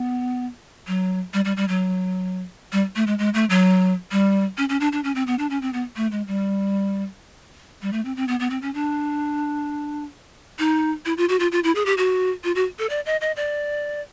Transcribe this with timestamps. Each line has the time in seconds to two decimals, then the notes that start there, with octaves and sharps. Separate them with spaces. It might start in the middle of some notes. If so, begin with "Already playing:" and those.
Already playing: B3
0.87 F#3
1.34 G3
1.45 G3
1.57 G3
1.68 F#3
2.72 G3
2.96 A3
3.07 G#3
3.18 G#3
3.34 A3
3.50 F#3
4.11 G3
4.58 C#4
4.69 C#4
4.80 D4
4.92 D4
5.04 C#4
5.15 C4
5.27 B3
5.39 D4
5.50 C#4
5.62 C4
5.73 B3
5.96 A3
6.12 G#3
6.27 G3
7.82 G3
7.93 A3
8.05 C4
8.17 C4
8.28 B3
8.40 B3
8.50 C4
8.62 C#4
8.74 D4
10.59 D#4
11.05 E4
11.17 F4
11.29 F#4
11.40 F4
11.52 F4
11.64 E4
11.75 G#4
11.86 G4
11.98 F#4
12.44 F4
12.55 F#4
12.79 A4
12.90 D5
13.06 D#5
13.21 D#5
13.36 D5